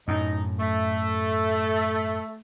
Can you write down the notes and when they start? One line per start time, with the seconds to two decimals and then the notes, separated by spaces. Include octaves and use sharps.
0.08 F#2 A2 D#4
0.60 A3